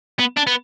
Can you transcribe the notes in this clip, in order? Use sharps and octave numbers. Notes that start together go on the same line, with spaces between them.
B3
D4
B3